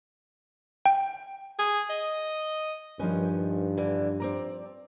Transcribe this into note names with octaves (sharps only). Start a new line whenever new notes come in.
G5
G#4
D#5
G2 D#3 F3 C#4 D#4 B4
D3 E3
C4 D5 A#5